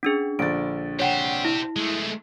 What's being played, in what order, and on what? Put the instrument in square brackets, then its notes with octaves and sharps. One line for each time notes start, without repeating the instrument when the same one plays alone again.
[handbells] C#4 D4 G#4
[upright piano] A#1 D3 A6 [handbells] D7
[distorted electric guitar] G4 C5 [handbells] C#5 F#5 G5
[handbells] E4
[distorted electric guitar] G#3 A3